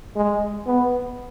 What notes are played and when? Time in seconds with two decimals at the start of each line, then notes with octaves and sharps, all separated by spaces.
0.16 G#3
0.67 B3